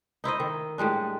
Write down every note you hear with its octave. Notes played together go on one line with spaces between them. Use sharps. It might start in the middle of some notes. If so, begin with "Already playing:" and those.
D#4 E4 C5 D#5
D#3
A2 G3 G#3 D4